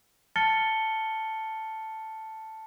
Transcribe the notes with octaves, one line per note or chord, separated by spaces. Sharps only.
A5 F6 A6 C#7 G7